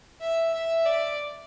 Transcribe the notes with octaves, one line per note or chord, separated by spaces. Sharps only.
E5
E5
D5